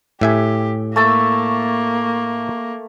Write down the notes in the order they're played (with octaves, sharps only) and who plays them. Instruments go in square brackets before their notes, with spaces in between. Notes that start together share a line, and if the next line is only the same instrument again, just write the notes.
[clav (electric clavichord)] A2 E5 G#5 [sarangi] G4
[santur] A3 A5 E6 [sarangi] A#3